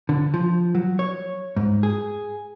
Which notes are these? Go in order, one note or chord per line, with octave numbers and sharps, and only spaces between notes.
D3
F3
F#3
C#5
G#2
G#4